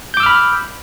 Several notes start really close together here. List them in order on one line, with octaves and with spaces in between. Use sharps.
G6 D6 E6 F6 B5